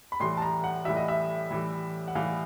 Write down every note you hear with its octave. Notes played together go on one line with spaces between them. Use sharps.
B5
A2 E3 G3 C6
A5
A#5
F#5
A2 E3 G3 E5
D#5
E5
A2 E3 G3
F#5
A2 E3 G3 F5